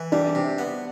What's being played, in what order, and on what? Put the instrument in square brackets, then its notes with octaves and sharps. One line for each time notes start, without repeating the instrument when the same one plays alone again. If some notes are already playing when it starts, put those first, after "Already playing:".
Already playing: [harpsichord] E3
[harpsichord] G3 [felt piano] D4
[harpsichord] C3
B3